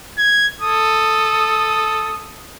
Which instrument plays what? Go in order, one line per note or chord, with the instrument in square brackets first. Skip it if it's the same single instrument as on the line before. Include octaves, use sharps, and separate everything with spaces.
[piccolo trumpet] G#6
[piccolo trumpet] A4 [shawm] D#6